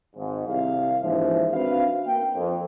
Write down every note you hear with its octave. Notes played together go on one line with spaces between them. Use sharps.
G#1 G#2
C2 F5
D#2 G#2 E3 F3 C#4 E5
C4 D4 F#4 B4 F5
A#3 G5
F2